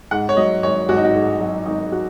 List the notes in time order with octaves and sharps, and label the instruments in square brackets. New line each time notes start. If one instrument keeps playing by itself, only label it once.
[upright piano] G#2 F#5
C#5
F#3 D#5
G#1 C#5
G#1 F#4
D#4
F#4
G#2
F#3
G#1 D#4
F#4